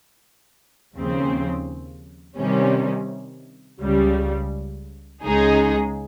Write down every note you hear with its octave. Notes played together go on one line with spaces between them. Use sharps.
D#2 C#3 F3 C4
C3 D#3 G3 C#4
C#2 C#3 G3
C#2 C#3 G#3 D#4 G#4